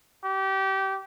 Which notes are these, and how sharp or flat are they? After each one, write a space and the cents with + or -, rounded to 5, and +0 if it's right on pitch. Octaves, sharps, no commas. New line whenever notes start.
G4 -25